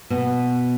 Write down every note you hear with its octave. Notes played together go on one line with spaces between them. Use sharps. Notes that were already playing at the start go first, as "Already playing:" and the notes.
B2